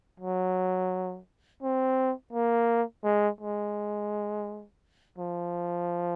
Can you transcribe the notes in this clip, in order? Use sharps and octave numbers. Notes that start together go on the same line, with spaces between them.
F#3
C4
A#3
G#3
G#3
F3